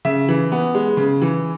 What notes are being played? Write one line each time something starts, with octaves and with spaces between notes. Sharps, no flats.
C#3 E5
E3
B3
G#3
C#3
E3